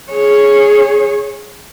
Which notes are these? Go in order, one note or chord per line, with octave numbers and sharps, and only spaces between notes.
G#4 C#5